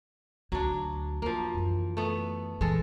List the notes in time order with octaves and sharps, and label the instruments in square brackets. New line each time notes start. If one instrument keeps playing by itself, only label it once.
[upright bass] D2 [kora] F#3 D4
[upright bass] E2 [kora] F3 A#3
[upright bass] F#2 E3
[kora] A3 B3
[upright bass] A#2 E3 [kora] G#3 A4